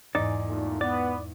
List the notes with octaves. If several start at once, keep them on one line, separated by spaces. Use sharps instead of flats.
E2 G#2 D#4 D5
A#2 A3
B3 D5